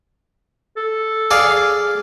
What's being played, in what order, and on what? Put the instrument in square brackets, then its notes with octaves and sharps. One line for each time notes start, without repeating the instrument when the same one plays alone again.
[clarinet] A4
[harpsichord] G#4 D5 F5